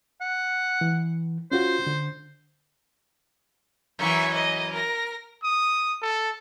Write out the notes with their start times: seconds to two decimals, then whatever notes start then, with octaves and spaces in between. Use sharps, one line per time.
0.21 F#5
0.81 E3
1.52 C#4 F4 F#4 C5
1.87 D3
3.99 F#2 D3 E3 E5 C#6
4.34 D#5
4.72 A#4 A#6
5.43 D#6
6.02 A4